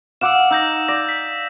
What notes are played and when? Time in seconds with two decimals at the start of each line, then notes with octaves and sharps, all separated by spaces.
0.21 F5 F#5 D6 E6 E7
0.51 D#4 E6 G6 A#6
0.88 D5 A#6
1.09 B6